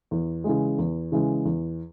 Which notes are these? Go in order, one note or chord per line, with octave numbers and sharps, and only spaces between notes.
E2
C#3 E3 G#3
E2
C#3 E3 G#3
E2